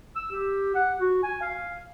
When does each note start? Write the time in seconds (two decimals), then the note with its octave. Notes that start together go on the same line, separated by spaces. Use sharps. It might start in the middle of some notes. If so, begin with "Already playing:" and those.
0.15 E6
0.31 G4
0.75 F#5
1.00 F#4
1.23 G#5
1.42 F5